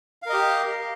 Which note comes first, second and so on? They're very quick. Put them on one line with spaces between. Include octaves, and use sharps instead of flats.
F5 A#4 D#5 G4